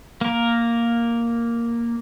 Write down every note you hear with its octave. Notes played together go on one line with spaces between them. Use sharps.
A#3 A#4